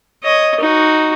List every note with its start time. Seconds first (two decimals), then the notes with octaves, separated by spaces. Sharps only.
0.23 C#5 D#5
0.60 D#4 F#4